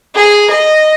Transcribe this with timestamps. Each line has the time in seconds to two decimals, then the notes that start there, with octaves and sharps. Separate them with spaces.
0.15 G#4
0.51 D#5